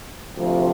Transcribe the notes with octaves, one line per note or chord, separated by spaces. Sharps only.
D2 C3 F3